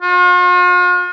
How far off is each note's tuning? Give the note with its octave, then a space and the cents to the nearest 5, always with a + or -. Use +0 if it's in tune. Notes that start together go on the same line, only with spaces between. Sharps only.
F4 +45